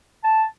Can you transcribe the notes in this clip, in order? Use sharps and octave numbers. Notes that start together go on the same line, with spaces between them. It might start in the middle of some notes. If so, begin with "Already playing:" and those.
A5